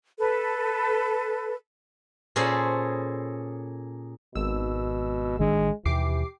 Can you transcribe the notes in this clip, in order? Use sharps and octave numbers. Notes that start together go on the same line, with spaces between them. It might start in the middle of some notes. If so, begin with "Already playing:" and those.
A4 B4
A#2 C#4 G#4 A4 C5 B5
G#1 B2 E6
A1 D#3 G#3 D4
D#2 B2 E3 G4 D6 C7